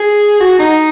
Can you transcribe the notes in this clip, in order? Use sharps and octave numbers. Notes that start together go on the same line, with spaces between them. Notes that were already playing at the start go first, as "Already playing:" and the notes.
Already playing: G#4
F#4
D#4